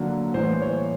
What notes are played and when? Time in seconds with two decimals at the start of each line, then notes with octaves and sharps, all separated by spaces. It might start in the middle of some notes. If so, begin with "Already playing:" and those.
Already playing: D3 F#3 A#3
0.34 A2 E3 G3 A#3 C5
0.62 C#5